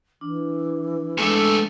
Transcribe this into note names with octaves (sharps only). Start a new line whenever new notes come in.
E3 D4
E2 G#3 A3 D4 A4